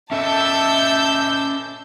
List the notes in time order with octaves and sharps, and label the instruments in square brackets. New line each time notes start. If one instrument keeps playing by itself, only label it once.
[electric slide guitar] C#4 A4 D#5 [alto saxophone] E5 [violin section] A5 E6 G6